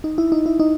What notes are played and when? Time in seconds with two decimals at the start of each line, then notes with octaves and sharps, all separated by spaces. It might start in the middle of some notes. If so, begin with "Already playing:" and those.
0.04 D#4
0.18 E4
0.32 D#4
0.46 E4
0.60 D#4